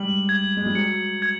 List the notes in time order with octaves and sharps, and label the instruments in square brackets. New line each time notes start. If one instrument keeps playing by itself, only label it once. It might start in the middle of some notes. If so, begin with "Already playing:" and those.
Already playing: [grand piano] G3 G#3 [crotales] F#7
[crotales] G#6
[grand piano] G#3
G3
[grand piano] F#3 [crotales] C#7
[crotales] G#6